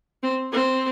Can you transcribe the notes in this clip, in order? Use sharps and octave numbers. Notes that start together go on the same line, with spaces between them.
C4
C4